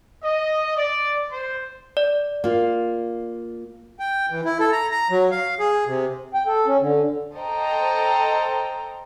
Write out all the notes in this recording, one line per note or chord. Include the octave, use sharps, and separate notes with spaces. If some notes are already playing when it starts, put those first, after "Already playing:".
D#5
D5
C5
D5
A#3 F4
G5
E3
E4
A4
A#5
A#5
F#3
F5
G#4
C3
G5
A4
C#4
D3
A4 C5 D#5 G5 A#5